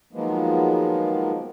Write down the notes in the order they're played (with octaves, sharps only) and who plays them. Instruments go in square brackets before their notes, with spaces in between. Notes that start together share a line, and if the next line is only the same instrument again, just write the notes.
[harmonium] D#3 F3 F#3 G#3 A#3 B3